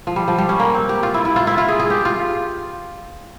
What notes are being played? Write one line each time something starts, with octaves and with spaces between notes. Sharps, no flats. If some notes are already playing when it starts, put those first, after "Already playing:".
F3
G3
F3
G3
C#4
A#3
C4
G4
F4
E4
E4
F4
E4
F4
G#4
G#4
G4
F4